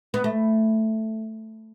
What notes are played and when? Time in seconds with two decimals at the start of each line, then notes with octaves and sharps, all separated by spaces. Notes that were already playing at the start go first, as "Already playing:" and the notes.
0.14 B3
0.24 A3